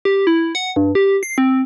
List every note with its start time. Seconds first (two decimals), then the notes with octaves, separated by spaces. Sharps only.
0.05 G4
0.27 E4
0.55 F#5
0.76 G2
0.95 G4
1.23 C7
1.38 C4